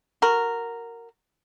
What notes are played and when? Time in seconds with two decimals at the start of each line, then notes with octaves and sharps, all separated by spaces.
0.22 F#4 A#4